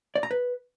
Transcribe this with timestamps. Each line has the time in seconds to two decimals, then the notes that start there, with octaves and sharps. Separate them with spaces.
0.16 D5
0.23 A#5
0.31 B4